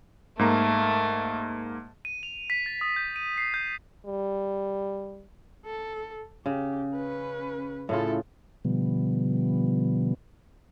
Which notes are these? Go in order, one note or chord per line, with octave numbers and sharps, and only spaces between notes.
G#2 A3 A#3 A#5
D#7
F7
B6
A6
D#6
G6
D#7
C7
G6
G3
A4
C#3 G4
C#4 B4
A2 C#3 E4 F4 A4
B2 D3 F3 G3 B3